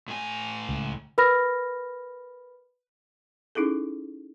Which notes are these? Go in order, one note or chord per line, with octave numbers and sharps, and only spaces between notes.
A2 G#5
C#2
A#4 B4 B5 F6 A#6
C#4 D#4 E4 G#4 A4